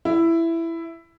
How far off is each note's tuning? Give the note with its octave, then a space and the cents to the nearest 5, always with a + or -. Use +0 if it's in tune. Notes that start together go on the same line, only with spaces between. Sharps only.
E4 +10